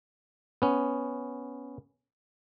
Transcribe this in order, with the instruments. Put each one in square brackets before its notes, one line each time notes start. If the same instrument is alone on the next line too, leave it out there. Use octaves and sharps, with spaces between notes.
[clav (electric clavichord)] B3 C#4